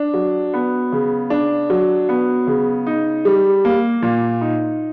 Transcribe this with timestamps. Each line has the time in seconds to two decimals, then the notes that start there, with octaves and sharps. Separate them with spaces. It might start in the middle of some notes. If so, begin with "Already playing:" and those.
Already playing: D4
0.14 F#3
0.54 B3
0.92 C#3
1.30 D4
1.70 F#3
2.09 B3
2.47 C#3
2.87 D#4
3.25 G3
3.65 A#3
4.02 A#2
4.41 D#4